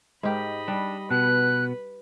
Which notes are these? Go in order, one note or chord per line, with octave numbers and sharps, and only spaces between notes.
G#2 G4 A#4 D#5 B5
G3 D4
B2 B3 B4 F#6